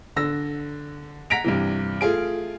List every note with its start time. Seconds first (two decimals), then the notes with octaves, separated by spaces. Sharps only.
0.16 D3 E6 A#6
1.30 F#5 A#5 A#6 B6 D7 F7
1.44 G2 C3 E3
2.01 A3 F4 G#4 D7